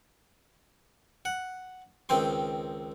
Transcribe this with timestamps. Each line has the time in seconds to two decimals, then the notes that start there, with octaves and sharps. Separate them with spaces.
1.25 F#5
2.09 C#2 D#3 C4 G5 C6